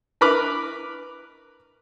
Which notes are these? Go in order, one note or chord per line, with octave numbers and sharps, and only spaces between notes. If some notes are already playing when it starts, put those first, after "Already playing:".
A#4 B4 B5 D6 F6